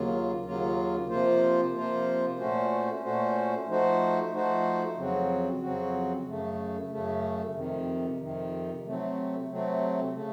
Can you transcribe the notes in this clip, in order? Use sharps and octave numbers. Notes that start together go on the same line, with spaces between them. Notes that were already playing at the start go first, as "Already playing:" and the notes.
Already playing: D#2 C#3 F#3 A#3 F4
D#2 C#3 F#3 A#3 F4
C3 F3 A#3 F4 C5
C3 F3 A#3 F4 C5
A#2 A3 C#4 F#4 C5
A#2 A3 C#4 F#4 C5
F3 A3 D#4 F#4 C5
F3 A3 D#4 F#4 C5
F2 C#3 F#3 C4 F#4
F2 C#3 F#3 C4 F#4
F#2 C#3 A3
F#2 C#3 A3
F2 C3 D#3
F2 C3 D#3
C3 F#3 A3 C4
C3 F#3 A3 C4
C#3 A3